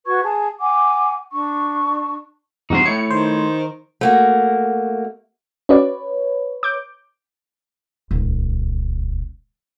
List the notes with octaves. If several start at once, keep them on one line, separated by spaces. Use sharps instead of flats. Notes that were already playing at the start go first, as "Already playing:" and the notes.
F#4 B4 C#6 G#6
G#4 A5
F#5 G#5 D6
D4 C#6
E2 G2 C3 D#4 F#4 C6
A3 E4 C#5 C#7
D#3 C5
A3 A#3 F#4
C#4 F#4 B4 C#5 D5
D6 G6
D#1 C#2